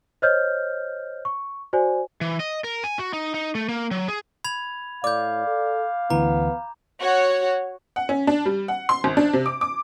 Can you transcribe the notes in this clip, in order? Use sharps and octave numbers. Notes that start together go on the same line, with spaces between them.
C5 C#5 D#5 F6 G6
C#6
F#4 C5 D5 G#5
E3
D#5
A#4
G#5
F#4
D#4
D#4
A3
A#3
F#3
G#4
B5 G#6 F7
A2 D5 F5 D6 G6
A4
D2 E3 B3 A#5
F#4 C#5
F#5
C#4
D4
G3
F#5
C6
G#1
D4
C3
D6
D6